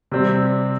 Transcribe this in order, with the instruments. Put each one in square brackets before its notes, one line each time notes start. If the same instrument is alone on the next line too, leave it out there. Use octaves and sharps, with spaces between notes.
[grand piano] C3 G3 C4